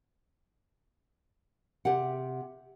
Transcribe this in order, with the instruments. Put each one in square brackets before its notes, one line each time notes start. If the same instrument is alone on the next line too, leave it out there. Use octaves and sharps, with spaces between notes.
[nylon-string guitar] C3 G4 F#5